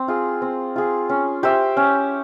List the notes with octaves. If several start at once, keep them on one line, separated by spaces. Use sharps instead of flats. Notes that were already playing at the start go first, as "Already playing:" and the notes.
Already playing: C4
F4 G#4
C4
F4 G#4
C#4
G4 C5 E5
C#4